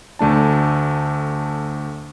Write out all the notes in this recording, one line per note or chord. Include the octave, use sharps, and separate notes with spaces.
D2 A3 D4 A5